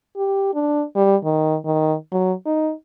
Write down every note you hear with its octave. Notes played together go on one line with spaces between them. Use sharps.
G4
D4
G3
D#3
D#3
F#3
D#4